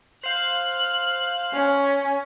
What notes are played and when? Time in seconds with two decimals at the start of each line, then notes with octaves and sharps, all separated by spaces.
0.24 C5 F5 F#6
1.54 C#4